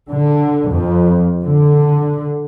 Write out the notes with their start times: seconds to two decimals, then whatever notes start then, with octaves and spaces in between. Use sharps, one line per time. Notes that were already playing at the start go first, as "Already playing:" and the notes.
0.11 D3
0.70 F2
1.44 D3